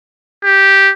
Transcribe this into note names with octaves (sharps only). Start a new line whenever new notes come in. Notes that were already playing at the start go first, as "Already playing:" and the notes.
G4